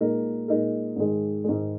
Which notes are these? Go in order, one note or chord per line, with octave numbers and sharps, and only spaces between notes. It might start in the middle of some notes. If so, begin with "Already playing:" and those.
A#2 G#3 D#4 A#4
A#2 G#3 D#4 A#4
G#2 D#3 G#3
G#2 D#3 G#3